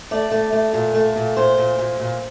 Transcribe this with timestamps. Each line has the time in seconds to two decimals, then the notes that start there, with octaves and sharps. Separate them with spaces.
0.11 A3 D5
0.32 A3
0.53 A3
0.74 A#2
0.94 A3
1.16 A#2
1.37 A#2 C5
1.58 A#2
1.79 A#2
2.00 A#2